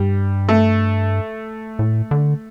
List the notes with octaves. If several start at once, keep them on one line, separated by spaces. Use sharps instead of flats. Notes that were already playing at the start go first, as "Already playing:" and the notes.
Already playing: G2 G3
A3
A2
D3